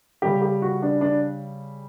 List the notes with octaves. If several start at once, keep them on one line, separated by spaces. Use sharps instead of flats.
C#3 G3 G4
G4
F#4
D4
D4